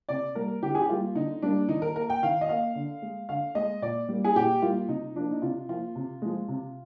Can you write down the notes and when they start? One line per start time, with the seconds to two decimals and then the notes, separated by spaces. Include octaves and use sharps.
0.09 C3 D5
0.35 G3 A#3 A#4
0.62 D3 G4
0.75 G#4
0.82 G4
0.89 G3 A#3 F4
1.15 D3 D#4
1.42 G3 A#3 D4
1.68 D#3 D#4
1.82 A#4
1.96 A#3 A#4
2.10 G5
2.23 D#3 F5
2.41 D#5
2.49 A#3 F5
2.75 D3
3.02 G#3
3.29 D3 F5
3.55 G#3 D#5
3.82 A#2 D5
4.09 G3 A#3
4.24 G#4
4.36 A#2 G4
4.62 G3 A#3 F4
4.88 C3 D#4
5.16 F3 A#3 D4
5.31 D#4
5.42 C3 F4
5.69 F3 A#3 F4
5.95 C3
6.22 F3 G#3
6.48 C3